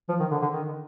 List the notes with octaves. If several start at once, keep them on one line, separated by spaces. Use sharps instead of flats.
F3
D#3
D3
D3
D#3